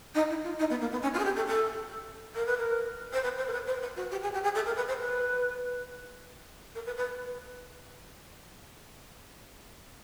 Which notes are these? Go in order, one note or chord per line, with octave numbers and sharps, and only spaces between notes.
D#4
E4
F4
D#4
B3
A#3
B3
C#4
F4
G#4
G4
A4
A4
A#4
B4
A#4
C5
B4
C5
A#4
B4
C5
B4
F#4
G4
G#4
G4
G#4
A4
A#4
B4
C5
B4
A#4
B4
B4